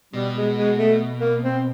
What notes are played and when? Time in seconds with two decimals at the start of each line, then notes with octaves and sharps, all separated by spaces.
0.13 B2 G3
0.35 G#3
0.57 G#3
0.78 A3
1.21 A#3
1.43 C4